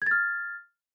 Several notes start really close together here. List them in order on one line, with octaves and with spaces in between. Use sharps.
G#6 A6 F6